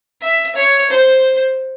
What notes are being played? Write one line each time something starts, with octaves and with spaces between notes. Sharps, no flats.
E5
C#5
C5